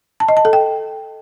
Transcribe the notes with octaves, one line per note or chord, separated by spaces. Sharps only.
A5
D#5
A5
A4
G5